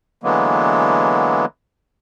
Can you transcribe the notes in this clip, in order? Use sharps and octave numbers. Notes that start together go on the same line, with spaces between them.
D3 E3 F#3 G#3 A#3 B3